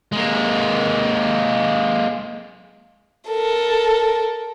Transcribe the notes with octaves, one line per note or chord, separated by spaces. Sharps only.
G#3 A#3
A4 A#4